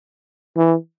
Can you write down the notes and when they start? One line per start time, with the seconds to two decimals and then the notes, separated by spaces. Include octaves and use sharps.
0.56 E3